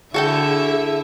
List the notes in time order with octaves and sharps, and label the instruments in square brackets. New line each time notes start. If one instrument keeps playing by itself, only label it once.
[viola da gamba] D3 E4 [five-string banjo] F#4 A4 G5 [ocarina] G#4 [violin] E5